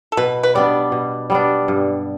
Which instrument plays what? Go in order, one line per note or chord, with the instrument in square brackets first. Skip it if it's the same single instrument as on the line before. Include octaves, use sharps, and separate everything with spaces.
[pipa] A4
[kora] B2 [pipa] B4
[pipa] B4
[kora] G3 B3 D4 [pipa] D5
[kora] B2
G3 B3 D4
G2